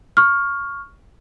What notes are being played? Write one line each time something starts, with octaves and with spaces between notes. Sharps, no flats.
C#6 F6